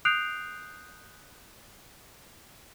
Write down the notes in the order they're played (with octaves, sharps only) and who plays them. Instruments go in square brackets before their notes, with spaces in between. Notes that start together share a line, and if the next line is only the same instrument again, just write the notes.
[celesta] D#6 F#6 G6 C7 D7 F7